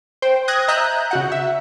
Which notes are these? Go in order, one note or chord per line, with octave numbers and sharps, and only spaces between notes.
C5 G5
D#6 F#6 G#6 A#6
D#5 E5 A#5 F#6 G6
C#3 F#4 F#5
E5